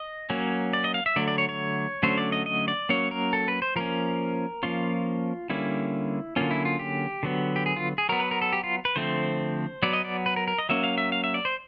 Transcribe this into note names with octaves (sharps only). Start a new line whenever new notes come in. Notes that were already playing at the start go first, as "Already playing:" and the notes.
Already playing: D#5
F#3 A#3 C#4
D5
D#5
F5
E5
D3 F#3 A3 D5
D5
C#5
C#5
D3 F#3 A3 C#4 C5
D5
D#5
D#5
D5
F#3 A#3 C#4 C#5
A#4
A4
B4
C5
F3 A#3 C#4 A#4
F3 A#3 C#4 F4
D3 G3 A#3 C#4 E4
D3 F#3 A#3 C#4 F4
E4
F4
G4
D3 F#3 B3
G4
G#4
F4
G#4
F#3 B3 A#4
B4
A#4
A4
G4
F4
B4
D3 F3 A3 C4 C5
F#3 B3 D5
D#5
D5
B4
A#4
A#4
D#5
F#3 A#3 C#4 E5
F5
E5
F5
E5
D5
C5